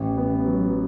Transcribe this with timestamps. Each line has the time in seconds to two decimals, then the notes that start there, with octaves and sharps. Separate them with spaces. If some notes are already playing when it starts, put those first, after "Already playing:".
Already playing: A1
0.17 B3
0.46 F#3